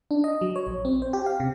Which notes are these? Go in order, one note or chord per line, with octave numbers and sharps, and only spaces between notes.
D4
D#5
F#3
C#5
A#1
C4
C5
G4
F5
C3